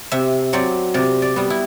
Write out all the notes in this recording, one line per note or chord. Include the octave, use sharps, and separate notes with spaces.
C3 E5
F#3 C4 D5
C3 D5
D5
G3 B3
E4